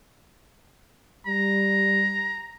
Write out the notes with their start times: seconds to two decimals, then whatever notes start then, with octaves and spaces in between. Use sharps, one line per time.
1.27 G3 A#5